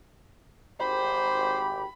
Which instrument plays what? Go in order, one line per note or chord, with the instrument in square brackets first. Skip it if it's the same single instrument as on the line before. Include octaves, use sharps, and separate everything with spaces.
[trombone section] G#1 G4 [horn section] C5 [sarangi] B5